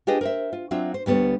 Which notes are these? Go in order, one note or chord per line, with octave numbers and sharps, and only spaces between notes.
D4 F4 G4 G#4 B4 D#5
A#4 C5 E5
F4
F#3 C4 D4 F4 E5
C5
D2 G3 B3 A4 C#5